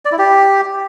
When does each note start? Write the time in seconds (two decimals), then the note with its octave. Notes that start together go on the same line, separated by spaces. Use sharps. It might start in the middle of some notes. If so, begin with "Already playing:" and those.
0.05 D5
0.12 E4
0.18 G4